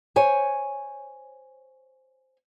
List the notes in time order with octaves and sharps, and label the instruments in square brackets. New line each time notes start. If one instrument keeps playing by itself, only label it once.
[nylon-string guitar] C5 C#5 G#5